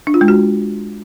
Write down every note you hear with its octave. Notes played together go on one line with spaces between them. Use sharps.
D4
F4
G#3
F#4